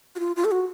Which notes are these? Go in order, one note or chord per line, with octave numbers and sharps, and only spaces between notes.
F#4
F4
F4
A4
F#4